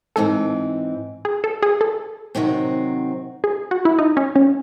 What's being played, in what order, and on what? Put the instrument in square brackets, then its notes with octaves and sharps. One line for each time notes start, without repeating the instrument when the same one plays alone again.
[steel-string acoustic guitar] G#2 E3 C4 [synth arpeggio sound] A4
[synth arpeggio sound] G#4
A4
G#4
A4
[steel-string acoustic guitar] C3 D#3 F#3 C4 F#4
[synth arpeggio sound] G#4
F#4
E4
D#4
C#4
C#4